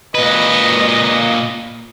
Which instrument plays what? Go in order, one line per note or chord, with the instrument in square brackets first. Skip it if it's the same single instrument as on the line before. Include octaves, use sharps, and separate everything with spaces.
[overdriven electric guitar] A#2 B4 [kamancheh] D#5